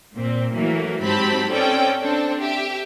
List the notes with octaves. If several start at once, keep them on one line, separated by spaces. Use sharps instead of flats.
A#2 C4
E3 F#3 A3 A#3
G#2 F#3 C4 G4 A5 B5
C4 C#4 A4 D5 G5
C4 D4 A4
G4 E5